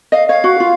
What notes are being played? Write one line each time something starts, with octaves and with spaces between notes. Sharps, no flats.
D#5 F5
C#5 F5
F#4
F4